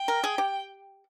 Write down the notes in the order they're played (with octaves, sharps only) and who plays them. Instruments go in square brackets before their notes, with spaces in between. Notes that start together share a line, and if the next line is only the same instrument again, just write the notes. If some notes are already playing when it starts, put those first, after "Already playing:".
Already playing: [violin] G5
[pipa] A#4
G#4
G4